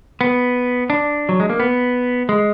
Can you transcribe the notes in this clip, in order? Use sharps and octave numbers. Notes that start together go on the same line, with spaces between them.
B3
D4
F#3
G#3
A#3
B3
G#3